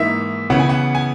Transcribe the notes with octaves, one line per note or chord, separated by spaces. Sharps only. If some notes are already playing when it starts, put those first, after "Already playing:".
Already playing: G#2 E3 A#3 D#4 E5
C#3 E3 B3 F#5
G#5
F#5
G#5